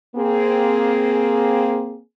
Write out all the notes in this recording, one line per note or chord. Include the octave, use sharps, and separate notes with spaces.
A#3 C4 G#4